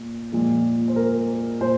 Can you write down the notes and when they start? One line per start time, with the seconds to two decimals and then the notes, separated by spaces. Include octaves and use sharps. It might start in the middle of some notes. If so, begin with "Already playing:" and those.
Already playing: A#2
0.32 A#2 F3 G#3
0.88 C5
0.96 A#4
1.61 A#2 C5